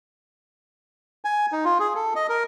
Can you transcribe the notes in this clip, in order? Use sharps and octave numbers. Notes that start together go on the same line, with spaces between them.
G#5
D#4
F4
G#4
A4
D#5
A#4